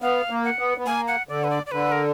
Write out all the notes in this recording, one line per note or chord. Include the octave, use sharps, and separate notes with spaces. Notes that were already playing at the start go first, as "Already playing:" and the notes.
B3 F5
A#3
F#5
B3
B3
A#3 G#5
F#5
D3 D5
B4
D5
D5
D3 B4
A#4